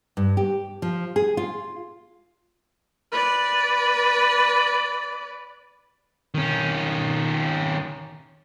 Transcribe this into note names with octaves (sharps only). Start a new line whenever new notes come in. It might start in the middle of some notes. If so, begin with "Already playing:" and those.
G2
G4
F3
G#4
F4
B4 D5
D#3 C#4